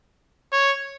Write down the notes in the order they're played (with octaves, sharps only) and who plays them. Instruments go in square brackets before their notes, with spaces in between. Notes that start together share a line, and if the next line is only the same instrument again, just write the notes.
[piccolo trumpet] C#5